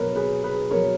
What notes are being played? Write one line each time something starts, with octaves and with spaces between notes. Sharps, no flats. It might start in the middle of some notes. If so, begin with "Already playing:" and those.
Already playing: B2 F#3 A#4 B4 C#5
G#4 B4
G#4 B4
B2 F#3 A#4 C#5